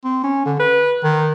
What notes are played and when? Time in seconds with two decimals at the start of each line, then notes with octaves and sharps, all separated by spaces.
0.04 C4
0.24 C#4
0.46 D3
0.59 B4
1.04 D#3